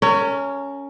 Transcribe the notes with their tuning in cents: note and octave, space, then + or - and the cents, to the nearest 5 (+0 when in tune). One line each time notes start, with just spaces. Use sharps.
C#4 +10 A#4 -30